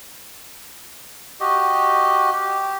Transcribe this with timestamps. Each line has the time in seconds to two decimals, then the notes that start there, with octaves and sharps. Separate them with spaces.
1.40 F#4 G4 D#5
2.32 G4